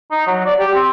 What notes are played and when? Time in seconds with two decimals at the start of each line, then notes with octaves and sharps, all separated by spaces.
0.11 D#4
0.27 F#3
0.46 D5
0.60 G4
0.75 C4